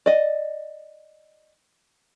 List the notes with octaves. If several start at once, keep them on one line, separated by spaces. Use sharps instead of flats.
D5 D#5